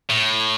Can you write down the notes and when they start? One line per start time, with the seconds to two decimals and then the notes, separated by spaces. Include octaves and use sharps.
0.10 A2